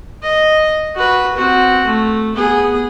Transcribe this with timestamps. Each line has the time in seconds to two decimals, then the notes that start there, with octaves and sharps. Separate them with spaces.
0.23 D#5
0.96 F#4 B4
1.36 C4 F#4
1.86 A3
2.36 B3 G#4